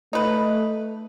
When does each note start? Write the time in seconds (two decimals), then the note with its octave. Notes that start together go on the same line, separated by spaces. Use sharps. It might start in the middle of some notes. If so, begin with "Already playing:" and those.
0.13 A3 D#4 B4